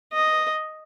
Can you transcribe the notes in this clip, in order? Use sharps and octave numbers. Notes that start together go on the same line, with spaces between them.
D#5